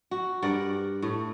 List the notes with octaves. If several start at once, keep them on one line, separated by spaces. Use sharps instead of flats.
F#4
G2 A#4 D5 F#5
A2 A3